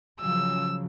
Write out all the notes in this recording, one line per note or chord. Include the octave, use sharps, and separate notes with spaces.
C#3 F3 F#3 E6